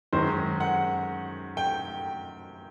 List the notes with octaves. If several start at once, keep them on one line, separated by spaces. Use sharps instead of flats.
F#2 D#3 G#3 C#4 C5
F#5
G5